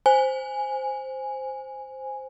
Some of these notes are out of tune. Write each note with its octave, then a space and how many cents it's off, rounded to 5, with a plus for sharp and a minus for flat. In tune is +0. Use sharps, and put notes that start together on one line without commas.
C5 +0 G#5 -5